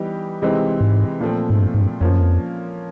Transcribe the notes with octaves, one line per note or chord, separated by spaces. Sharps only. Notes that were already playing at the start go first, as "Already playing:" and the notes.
Already playing: E3 G3 B3 D#4 G4
C3 E3 G#3 C4 D#4
G#2
A#2 F3 A3 C4
G#2
G2
G#2
G2
F2 F3 A#3 C#4
F#2
F2